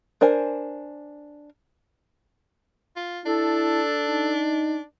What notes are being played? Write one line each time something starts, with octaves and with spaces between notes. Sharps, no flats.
D4 A#4 C5 G#5
F4
D4 E4 A4
D#4